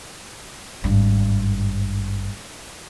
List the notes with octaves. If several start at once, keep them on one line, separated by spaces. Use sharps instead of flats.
G#1 G2